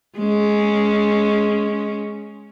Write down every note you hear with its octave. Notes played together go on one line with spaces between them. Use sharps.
G#3 C#4